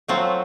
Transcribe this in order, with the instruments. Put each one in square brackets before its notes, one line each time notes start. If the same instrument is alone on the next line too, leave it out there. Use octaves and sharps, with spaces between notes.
[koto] F#3 A3 C4 F4